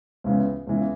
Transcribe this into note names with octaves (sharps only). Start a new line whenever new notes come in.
C#2 C#3 E3 B3
C#2 C#3 E3 B3